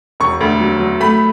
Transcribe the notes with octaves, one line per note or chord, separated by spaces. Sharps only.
E1 C#6
D2
F#3
F#3
A3 B5